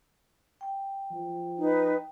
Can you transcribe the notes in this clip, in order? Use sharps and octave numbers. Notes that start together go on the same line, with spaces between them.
G5
F3
D#4 B4